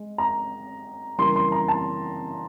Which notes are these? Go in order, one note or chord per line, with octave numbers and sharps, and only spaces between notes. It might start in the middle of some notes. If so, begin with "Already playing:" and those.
Already playing: G#3
A#5
C#3 E3 G3 A#3 C6
C6
A#5
A5